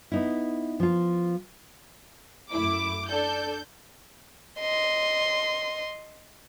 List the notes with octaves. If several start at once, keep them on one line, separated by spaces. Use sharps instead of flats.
B3 D#4 E4
F3 F4
F#2 A3 E4 D6
D4 A4 D5 G6
D#5 C6